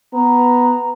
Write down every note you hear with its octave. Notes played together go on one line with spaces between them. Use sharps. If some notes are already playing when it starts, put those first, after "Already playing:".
B3 A#5